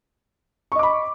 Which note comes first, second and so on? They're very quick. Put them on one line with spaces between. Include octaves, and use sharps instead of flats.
C#6 D#5 D6 B5